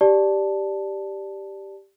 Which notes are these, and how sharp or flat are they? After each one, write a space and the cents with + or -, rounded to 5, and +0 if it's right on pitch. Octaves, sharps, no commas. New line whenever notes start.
G4 +0 D5 +0 A5 +0